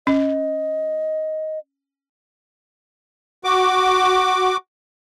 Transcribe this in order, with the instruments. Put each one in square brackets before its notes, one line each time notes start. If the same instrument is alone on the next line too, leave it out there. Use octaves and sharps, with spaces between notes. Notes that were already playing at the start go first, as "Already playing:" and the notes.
[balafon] C#4 [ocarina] D#5
[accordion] F#4 D6